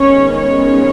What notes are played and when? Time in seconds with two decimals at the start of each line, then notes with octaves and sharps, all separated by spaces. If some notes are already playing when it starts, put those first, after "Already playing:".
Already playing: D#3 G#3 B3 C#4 C#5
0.36 C#4 C#5